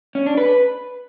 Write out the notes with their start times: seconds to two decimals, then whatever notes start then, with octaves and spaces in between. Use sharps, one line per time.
0.15 C#4
0.26 D4
0.37 B4